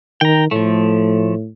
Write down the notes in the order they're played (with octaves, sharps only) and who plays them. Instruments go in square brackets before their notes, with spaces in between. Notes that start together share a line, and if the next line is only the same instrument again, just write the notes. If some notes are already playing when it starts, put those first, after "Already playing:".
[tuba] D#3 [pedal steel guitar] G5 A#5
[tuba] A2 [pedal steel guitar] F3 A3